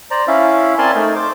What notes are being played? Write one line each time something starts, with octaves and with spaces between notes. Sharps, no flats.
C5 D5 A#5
C#4 E4 E5 F5
C4 A#4 D5 G#5 A5 C6
A3 D#4 A#4
C5 D6